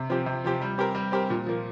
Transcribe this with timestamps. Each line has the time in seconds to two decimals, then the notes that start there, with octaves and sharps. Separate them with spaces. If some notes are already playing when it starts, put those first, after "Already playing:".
Already playing: C3
0.10 F3 C4 G4
0.26 C3
0.44 F3 C4 G4
0.61 G3
0.78 C4 G4 A#4
0.95 G3
1.12 C4 G4 A#4
1.30 A#2
1.46 F3 A#3